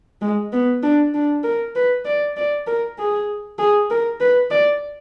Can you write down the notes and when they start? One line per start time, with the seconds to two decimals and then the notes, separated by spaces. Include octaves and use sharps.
0.21 G#3
0.53 B3
0.83 D4
1.14 D4
1.44 A#4
1.76 B4
2.05 D5
2.37 D5
2.67 A#4
2.98 G#4
3.58 G#4
3.90 A#4
4.20 B4
4.50 D5